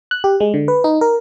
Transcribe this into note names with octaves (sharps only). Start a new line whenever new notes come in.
F#6
G4
G#3
D3
B4
D#4
A#4